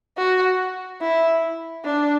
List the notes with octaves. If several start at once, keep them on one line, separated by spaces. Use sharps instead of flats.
F#4
E4
D4